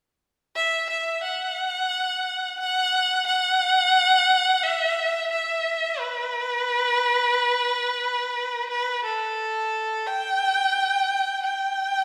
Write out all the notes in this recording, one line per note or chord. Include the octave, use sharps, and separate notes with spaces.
E5
E5
F#5
F#5
F#5
E5
E5
B4
B4
A4
G5
G5